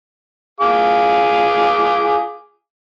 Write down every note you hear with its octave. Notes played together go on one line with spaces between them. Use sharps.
G#4 F5 D6